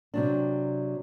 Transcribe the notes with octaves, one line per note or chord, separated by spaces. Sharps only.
C3 F#3 D4